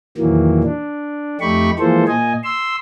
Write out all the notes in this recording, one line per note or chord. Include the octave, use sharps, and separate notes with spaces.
E2 A#2 D#3 E3 F#3 A#3
D4
F2 A3 D#4 G4 B5 C#6
E3 F3 G#3 A#3 A4 C5
A#2 D#5 G#5
C6 E6